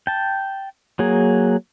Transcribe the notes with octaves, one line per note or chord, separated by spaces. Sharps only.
G5 A5
F#3 A#3 G#4